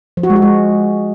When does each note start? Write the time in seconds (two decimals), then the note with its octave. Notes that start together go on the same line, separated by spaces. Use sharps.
0.17 F3
0.23 F#4
0.30 G#3
0.36 F#4
0.42 G#3